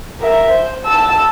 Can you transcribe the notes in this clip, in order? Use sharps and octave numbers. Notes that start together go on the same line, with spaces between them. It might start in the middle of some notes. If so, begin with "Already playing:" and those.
A#4 E5
C5
A5 E6